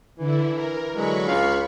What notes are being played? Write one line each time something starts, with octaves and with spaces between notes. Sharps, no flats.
D3 E3 E4
A#4
D3 F#3 G#3 B5 C#6
C#2 F5